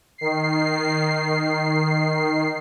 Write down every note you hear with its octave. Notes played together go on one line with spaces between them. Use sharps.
D#3 C7